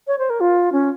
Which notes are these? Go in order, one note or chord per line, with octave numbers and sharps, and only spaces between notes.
C#5
C5
A#4
F4
C#4